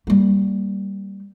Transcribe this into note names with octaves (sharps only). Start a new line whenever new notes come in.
G3 A#3